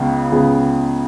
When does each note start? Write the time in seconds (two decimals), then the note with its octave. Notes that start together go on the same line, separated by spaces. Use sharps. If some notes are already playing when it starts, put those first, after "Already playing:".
Already playing: C#2 C#3 B3 G#4
0.32 C#2 C#3 B3 G#4